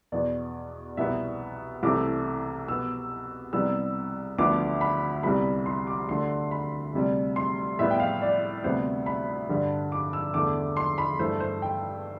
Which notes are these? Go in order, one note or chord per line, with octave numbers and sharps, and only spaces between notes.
E2 B2 B3 D5
C2 B2 B3 E5
C2 C3 E3 A3 D6
B2 B3 E6
C2 C3 G3 B3 E6
D2 D3 F3 B3 D6
B5
C2 C3 G3 B3 B5
C6
D6
D2 D3 A3 C6
B5
D2 C3 G3
C6
A2 G3 B3 E5
G5
F5
D5
D2 C3 G3 B3 C5
B5
G2 D3 G3
D6
E6
E2 D3 A3 D6
C6
B5
G2 E3 A3 C5
C5
G5